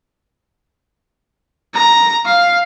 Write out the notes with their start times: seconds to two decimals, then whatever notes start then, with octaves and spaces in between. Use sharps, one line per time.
1.74 A#5
2.26 F5